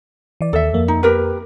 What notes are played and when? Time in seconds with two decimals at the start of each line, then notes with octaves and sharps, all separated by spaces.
0.41 E3 D5
0.53 D#2 A4 E5 E6
0.73 F2 A#3
0.88 D#4
1.03 G4 A#4 B4